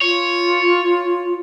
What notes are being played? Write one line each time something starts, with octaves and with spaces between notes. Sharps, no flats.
F4 C#5